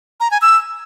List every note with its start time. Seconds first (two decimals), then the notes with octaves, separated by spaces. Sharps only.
0.20 A#5
0.31 G#5
0.42 E6